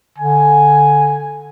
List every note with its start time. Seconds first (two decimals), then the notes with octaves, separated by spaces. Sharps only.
0.18 D3 G#5